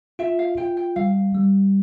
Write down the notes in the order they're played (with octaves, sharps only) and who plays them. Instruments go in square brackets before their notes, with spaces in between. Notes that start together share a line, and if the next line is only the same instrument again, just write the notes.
[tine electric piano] F4 [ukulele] E5
[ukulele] F5
[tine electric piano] F4 [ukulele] G5
[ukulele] G5
[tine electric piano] G3 [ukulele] F5
[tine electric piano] G3